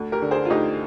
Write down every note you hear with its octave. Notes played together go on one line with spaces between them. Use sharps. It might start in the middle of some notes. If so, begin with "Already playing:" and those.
Already playing: D2
G4 A#4
D3
G#4 C5
F4
D2 D#4 G4